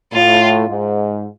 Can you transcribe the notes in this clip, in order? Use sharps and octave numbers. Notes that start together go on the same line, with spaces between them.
A2 F4
G#2